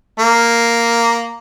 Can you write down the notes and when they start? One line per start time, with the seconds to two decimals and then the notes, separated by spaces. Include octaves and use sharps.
0.19 A#3